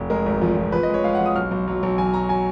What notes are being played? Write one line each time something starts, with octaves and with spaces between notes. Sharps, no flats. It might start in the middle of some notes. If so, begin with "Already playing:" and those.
Already playing: F1
G#3 A#4
G#1
F3
F3
F3 B4
D#5
G#3 C#5
G#3 F5
F#5
F3
D#6
B1 F6
B1
F#3
B1
F#3 G#5
F#3 A#5
F#3 G#5